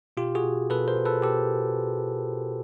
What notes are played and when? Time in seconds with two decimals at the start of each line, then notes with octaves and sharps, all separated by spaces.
0.17 B2 F4 G4
0.35 F#4 G#4
0.44 B2
0.70 B2 A4 B4
0.88 A#4 C5
0.96 B2
1.05 A4 B4
1.23 B2 G4 A4